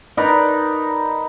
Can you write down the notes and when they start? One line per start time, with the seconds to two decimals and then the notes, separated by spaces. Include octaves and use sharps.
0.17 D#4 A#4 B4 D5